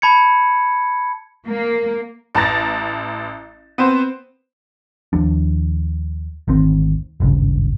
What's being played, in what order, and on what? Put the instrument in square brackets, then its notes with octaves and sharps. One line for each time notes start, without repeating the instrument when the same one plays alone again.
[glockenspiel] A5 B5 G#6 C#7
[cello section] A#3
[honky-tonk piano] A1 A5 A#5 A6
B3 C4 C5
[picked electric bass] D#2 F3 D4
G#1 D2 D#3 C4
D#1 G#1 G2 C#3